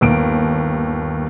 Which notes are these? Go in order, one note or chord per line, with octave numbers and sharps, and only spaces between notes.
G1 D#2 D7